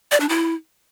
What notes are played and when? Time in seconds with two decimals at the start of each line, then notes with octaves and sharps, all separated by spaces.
0.11 D5
0.20 D4
0.29 E4